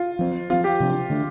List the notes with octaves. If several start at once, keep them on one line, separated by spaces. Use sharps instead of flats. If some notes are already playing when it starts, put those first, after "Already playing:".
Already playing: F4
F3 C4
F3 C4 F4
G4
C3 F3 D4
D3 A3 D4